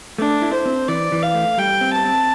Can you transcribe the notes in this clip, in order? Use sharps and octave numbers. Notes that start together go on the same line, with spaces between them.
A3 D4
E4
C5
C4
E3 D5
E3
F5
A3
G3 G5
C4
A5
C4